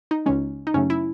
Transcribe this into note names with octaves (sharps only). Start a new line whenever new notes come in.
D#4
C#2 C#3 G#3 C#4
D#4
F#2 C#3 F#3 A3 C#4
E4